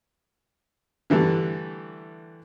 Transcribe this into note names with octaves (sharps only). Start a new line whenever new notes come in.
D3 E3 G3 A3